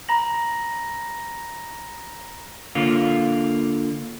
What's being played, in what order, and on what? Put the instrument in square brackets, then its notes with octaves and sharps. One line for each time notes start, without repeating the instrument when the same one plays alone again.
[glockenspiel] A#5 B5 A#6 F#7
[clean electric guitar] D3 A#3 F4